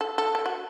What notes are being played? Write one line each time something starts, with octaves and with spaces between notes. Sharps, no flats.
A4
A4
A4
F#4